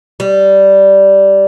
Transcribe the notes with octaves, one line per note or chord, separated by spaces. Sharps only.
G3